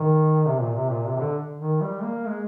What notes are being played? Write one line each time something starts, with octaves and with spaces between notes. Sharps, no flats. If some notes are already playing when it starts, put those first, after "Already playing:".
Already playing: D#3
C3
A#2
C3
A#2
C3
C3
D3
D#3
G3
A#3
G#3